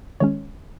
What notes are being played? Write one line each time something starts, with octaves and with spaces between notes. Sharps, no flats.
D#3 G#3 C#4 C#5